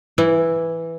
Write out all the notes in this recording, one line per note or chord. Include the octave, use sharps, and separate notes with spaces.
E3 E4